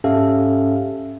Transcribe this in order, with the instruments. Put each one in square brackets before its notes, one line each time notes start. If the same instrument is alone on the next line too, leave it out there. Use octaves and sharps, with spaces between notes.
[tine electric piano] G#2 C#4 G4 A4 E5 F5